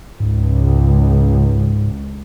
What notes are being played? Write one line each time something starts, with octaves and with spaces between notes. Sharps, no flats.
C#2 G#2